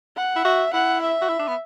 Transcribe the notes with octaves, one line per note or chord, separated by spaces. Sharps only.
F#5
E4
F#4 E5
E4 F#5
E5
F#4
E4
D4
B3